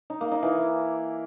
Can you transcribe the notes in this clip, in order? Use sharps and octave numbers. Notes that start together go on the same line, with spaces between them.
D#4
A#3
D#4
E3